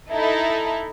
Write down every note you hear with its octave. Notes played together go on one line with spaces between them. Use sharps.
D#4 E4 A4